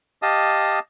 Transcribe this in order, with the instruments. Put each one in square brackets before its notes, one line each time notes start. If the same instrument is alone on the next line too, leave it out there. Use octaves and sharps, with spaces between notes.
[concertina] G4 D#5 F5 A5 D#6